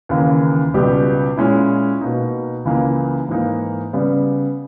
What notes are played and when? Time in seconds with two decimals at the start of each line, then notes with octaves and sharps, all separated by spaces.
0.09 D#2 C#3 E3 A#3
0.74 C#2 B2 G3 B3 G4
1.37 A#2 G#3 C#4 E4
2.01 B2 A#3 D#4
2.65 C#2 C#3 E3 A#3
3.29 G#2 E3 A#3 D#4
3.93 C#3 G3 B3